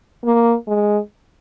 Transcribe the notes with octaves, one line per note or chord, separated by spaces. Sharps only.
A#3
G#3